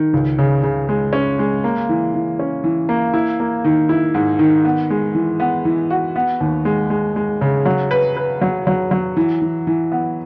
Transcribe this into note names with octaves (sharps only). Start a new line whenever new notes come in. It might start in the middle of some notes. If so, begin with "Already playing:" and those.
Already playing: D#3
C#2
C#3
C#3
G#3
C#4
G#3
A#3
E3
E3
C#4
E3
A#3
E4
A#3
D#3
E4
G#2
D#3
B3
G#3
E3
B3
E3
F#4
B3
D#2
G#3
G#3
G#3
C#3
F#3
B4
B4
F#3
F#3
F#3
E3
E3
E3
B3